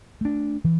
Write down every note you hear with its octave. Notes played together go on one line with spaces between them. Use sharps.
A3 D4
E3